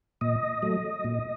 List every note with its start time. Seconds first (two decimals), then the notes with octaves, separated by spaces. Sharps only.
0.21 A#2 D#5
0.62 F#3 A3
1.04 A#2